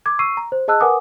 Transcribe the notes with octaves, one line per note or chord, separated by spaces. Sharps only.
D6 G#6
C#6 E6 C7 D#7
A#5
C5
G#4 D#5 A5 E6 F#6
A#4 B4 F#5 G#5 D6 D#6